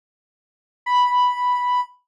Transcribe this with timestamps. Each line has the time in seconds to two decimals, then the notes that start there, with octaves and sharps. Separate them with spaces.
0.86 B5